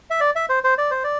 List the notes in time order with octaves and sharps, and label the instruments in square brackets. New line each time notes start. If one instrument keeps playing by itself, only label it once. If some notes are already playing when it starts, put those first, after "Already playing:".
[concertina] E5
D5
E5
C5
C5
D5
C5
D5